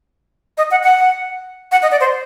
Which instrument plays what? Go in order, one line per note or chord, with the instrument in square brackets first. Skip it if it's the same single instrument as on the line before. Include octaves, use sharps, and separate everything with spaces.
[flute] D#5
F#5
F#5
F#5
D#5
D5
C5